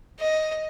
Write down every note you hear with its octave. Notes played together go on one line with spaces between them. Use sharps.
D#5